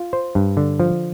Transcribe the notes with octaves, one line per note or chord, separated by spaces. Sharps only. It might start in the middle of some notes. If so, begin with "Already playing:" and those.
Already playing: F4
C5
G2
D3
F3